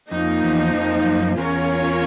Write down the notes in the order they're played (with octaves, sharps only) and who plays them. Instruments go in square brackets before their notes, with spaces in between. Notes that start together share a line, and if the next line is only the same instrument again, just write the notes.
[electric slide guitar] F2 [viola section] F3 A#3 D#4
[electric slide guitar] E2
F2
F#2
[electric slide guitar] E2 [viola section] C#4 F4 A#4 C#5